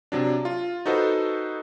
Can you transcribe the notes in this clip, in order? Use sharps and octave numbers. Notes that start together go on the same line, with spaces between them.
C3 F#3 D4
F4
D#4 F#4 A4 B4 C5 D#5